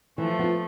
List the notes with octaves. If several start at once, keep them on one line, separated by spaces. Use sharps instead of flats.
E3 F3 A3
B3 F4